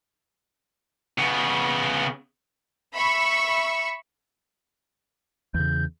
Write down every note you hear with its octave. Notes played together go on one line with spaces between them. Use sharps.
C#3 B3
E5 B5 C#6 E6
E2 C#3 G6